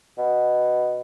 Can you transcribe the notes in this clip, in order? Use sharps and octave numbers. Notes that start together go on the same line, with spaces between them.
B2